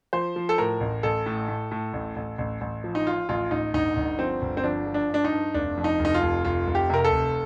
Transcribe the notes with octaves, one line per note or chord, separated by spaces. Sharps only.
F3 C5
F3
A4
A2 A#4
A1
A1 A4
A2
A2
A2
A1
A1
A1
A1
F3
D#4
F3 F4
A1 F4
A1 D#4
G1 D#4
G1
F3 C4
G1
C4
F3 D4
F3
D4
G2 D4
D#4
G2
F1 D4
F2
D#4
F1
D#4
F4
F1
F1 F4
F1
G4
C3 A#4
A4
F1